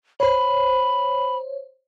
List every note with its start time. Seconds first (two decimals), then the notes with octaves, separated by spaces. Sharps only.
0.20 C5 C#5 B5